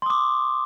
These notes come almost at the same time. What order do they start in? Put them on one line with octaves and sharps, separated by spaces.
C6 D#6 D6